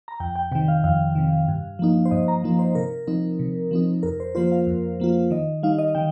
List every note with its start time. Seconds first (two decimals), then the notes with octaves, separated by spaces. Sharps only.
0.08 A#5
0.20 F2 G5
0.36 G5
0.51 C3 D#3 G5
0.68 F5
0.84 F2 F5
1.15 C3 D#3
1.48 G2
1.79 F3 A#3 D#4
2.05 C5
2.11 G2 D#5
2.28 A#5
2.44 F3 A#3 D#4
2.59 C5
2.75 C3 A#4
3.07 F3 C4 D#4
3.39 C3
3.71 F3 C4 D#4
4.03 F2 A#4
4.20 C5
4.35 F3 A#3 F4 C5
4.52 F5
4.67 F2
5.00 F3 A#3 F4
5.31 D#3 D#5
5.63 G3 D#4 F5
5.79 D#5
5.95 D#3 G5